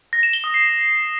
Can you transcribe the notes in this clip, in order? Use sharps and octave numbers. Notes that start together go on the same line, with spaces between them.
A#6
E7
G7
D#6
C7